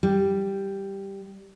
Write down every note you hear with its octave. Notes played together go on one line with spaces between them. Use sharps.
G3